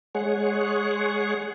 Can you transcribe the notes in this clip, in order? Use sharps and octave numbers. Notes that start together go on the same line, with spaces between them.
G#3 G#4 C#5 F#5